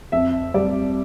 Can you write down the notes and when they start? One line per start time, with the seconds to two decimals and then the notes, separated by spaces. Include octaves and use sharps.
0.12 F2 E5
0.54 G3 D5